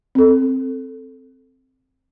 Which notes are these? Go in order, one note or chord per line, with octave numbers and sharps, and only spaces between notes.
C4 A4